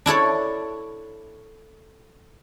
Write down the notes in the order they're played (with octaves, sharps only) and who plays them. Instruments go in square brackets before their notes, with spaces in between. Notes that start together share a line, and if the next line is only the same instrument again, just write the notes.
[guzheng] D4 E4 A4 C#5